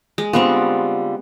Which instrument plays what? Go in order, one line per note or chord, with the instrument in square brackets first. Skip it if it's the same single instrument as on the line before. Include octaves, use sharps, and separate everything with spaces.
[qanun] G#3
[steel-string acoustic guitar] D3 G3 F4 [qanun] B3 C4 C#6